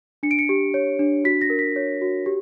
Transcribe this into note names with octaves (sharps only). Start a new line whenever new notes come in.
D4 C#7
D7
C#7
G4
C#5
D4
F#4 B6
A#6
A#4
B6
C#5
F#4
G4